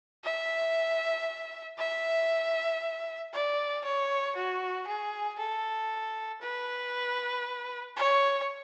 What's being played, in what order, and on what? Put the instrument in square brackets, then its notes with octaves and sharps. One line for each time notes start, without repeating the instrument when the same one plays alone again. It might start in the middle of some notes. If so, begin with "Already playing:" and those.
[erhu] E5
E5
D5
C#5
F#4
G#4
A4
B4
C#5